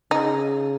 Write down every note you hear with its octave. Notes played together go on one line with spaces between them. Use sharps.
C#3 D#4